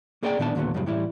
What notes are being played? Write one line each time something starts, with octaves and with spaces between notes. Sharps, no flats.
A#3 G#4 A#4 D5 D#5 G5
A#2 D#3 B3 D4 A5
D#2 A#2 D3 D#3 F#3 B3
F#2 A2 C#3 F#3 G3
A2 E3 G3 E4